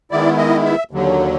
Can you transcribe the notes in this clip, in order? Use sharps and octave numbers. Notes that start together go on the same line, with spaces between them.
D#3 G#3 B3 E4 D5
D#5
E5
D#2 D3 F#3